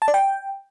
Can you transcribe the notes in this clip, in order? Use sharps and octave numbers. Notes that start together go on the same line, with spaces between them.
A5
D5
G5